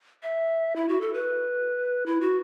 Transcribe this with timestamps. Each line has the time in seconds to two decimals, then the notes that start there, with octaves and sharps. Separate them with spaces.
0.23 E5
0.76 E4
0.89 F#4
1.01 A4
1.14 B4
2.06 E4
2.21 F#4